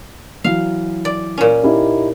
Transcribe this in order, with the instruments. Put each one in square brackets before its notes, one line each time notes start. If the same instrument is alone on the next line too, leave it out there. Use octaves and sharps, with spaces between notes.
[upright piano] E3 F#3 [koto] F5
[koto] D5
A#2 C#4
[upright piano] D#4 E4 G4